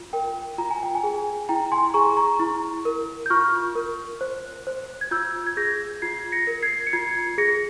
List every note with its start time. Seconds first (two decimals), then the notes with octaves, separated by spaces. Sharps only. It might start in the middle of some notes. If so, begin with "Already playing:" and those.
Already playing: F4
0.13 A#4 G5
0.58 F4 A#5
0.71 G#5
0.83 G5
0.95 G#5
1.03 G#4
1.49 E4 G5 A#5
1.72 G#5 C6
1.94 G#4 A#5 C#6
2.17 A#5 C#6
2.40 E4
2.85 A#4
3.26 G6
3.30 F4 C#6 F6
3.75 A#4
4.21 C5
4.67 C5
5.01 G#6
5.11 F4 E6 G6
5.47 G#6
5.57 G#4 G6 A#6
6.02 F4 G#6 C7
6.32 A#6 C#7
6.47 A#4
6.62 G#6 C7
6.87 C#7
6.93 F4 G#6 C7
7.38 G#4 A#6 C#7